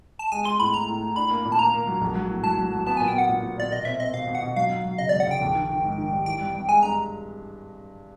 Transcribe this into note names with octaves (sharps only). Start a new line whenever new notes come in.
A5
G#3 G#5
G#3 C6
A2 B5
A2 A#5
A2
A2
D4 B5
A#3
A#2
A5
A#3 A#5
A#3
F#3
A#1
F#3
A2
F#3 A5
F#3
F#3
B3 A5
A#2 G#5
G5
B3 F#5
A#2
A#2
A#2 D5
B2 D#5
C4 E5
C4 D#5
B2 F5
B2
F#5
B2
F#3 F5
F#3
F#3
C#3 D#5
F#2 D5
F#5
C#3 G5
A#1
D#3
D#3
G#2
D#3
G3
E3 G5
G2
G2
G#3 G#5
G2 A#5